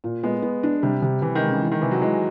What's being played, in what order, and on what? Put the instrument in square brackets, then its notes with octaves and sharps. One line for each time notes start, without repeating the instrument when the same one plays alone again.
[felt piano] A#2
[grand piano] G#3 [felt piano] B3
[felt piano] B3
D4
[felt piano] C3 [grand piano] G3
[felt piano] C3
[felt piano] C3 [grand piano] E3
[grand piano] D#3
[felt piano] G#3
[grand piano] C#3
[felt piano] E3
[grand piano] D#3
[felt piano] C3 [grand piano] E3
[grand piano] F#3
[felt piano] E3 [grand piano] G#3